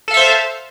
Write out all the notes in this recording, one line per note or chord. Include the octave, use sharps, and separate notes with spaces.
A4 C5 E5 F5